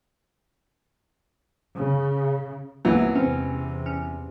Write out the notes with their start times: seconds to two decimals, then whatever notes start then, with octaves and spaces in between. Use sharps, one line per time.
1.76 C#3
2.85 C2 G2 E3 F#3 G#3 A#3 B3 E4
3.16 E2 C3 C4 C#4
3.86 C#4